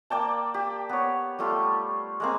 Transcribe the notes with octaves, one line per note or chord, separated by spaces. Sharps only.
A#3 D5 G5 A5
G4
B3 C#5
G3 A3 F4 G4
G#3 A#3 C4